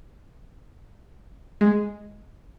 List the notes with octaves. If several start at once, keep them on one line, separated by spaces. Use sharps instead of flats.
G#3